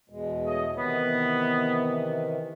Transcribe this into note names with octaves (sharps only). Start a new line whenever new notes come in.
E2 B2 G#3
A3 C#5 D#5
C3 D#3 E3 B3